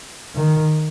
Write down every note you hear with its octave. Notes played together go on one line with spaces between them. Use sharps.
D#3